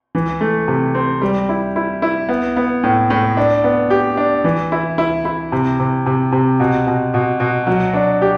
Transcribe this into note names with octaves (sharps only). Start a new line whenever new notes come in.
E3
A3
C3
C4
G3
E4
E4
E4
B3
B3
A2
A2
D4
B3
G4
D4
E3
E4
E4
E4
C3
C3
C3
C3
B2
B2
B2
B2
F#3
D4
G4